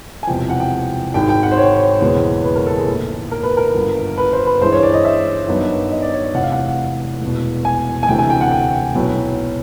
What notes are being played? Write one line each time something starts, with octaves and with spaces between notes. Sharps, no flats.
G#5
E1 E2 C3 F3 G5
F#5
G5
G#1 G#2 D#3 G#3 G5
G5
F#5
C5
C#5
F#1 E2 B2 G#3 B3
B4
A#4
A4
G#4
A#1 G#2 E3 A3
A#4
B4
A#4
G1 G2 D3
B4
C5
B4
G2 E3 G#3 C#4 E4 C5
C#5
D5
D#5
E5
G2 D#3 F#3 B3 D#4
D#5
D5
C#5
D#5
F1 E2 C3 F#5
F5
F#5
E1 E2 B2
G#5
G#5
D2 C3 E3 A3 D4 G5
G#5
G5
F#5
G5
B1 A2 F#3 B3